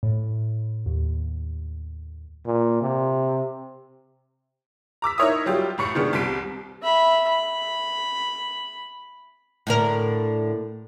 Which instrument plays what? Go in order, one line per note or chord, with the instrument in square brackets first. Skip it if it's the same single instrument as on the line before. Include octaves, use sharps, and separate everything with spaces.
[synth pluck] A2
D#2
[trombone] A#2
C3
[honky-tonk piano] A#5 D6 E6 B6
D#4 E4 A#4 C#5 E5 D#6
F#3 G3 F4 G4
A1 A2 C#6 C#7
C3 D#3 G#3 B3 D4
C2 C3 B6 D7
[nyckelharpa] E5 B5
B5
[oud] A2 D3 A#4